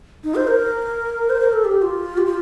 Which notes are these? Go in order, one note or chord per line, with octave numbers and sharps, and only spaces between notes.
D#4
C5
A#4
C5
A#4
A4
G4
F4
G4
F4